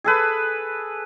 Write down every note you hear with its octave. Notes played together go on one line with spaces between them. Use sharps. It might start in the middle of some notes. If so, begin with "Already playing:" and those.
G#4 A4 B4